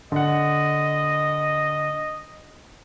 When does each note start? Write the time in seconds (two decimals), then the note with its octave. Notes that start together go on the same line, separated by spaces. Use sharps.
0.12 D3 D#5 F#5